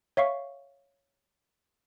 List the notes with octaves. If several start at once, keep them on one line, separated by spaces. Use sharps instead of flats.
C#5 E5 F5 C#6